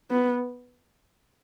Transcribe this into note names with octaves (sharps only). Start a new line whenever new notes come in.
B3